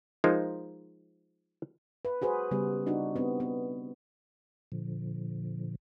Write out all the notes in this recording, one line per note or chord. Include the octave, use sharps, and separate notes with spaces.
F3 G#3 D#4 F4 A#4 C5
B4
F#4 G#4 B4 C5
C#3 G3 B3
D4 D#4 F#4
B3 C4
B3
A#2 D3 F3